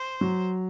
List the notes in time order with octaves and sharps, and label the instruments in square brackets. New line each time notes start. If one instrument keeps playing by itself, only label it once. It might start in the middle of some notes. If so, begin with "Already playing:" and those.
Already playing: [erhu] C5
[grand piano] F#3